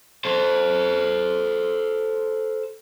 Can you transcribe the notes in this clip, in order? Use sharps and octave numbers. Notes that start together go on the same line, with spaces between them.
A4 C5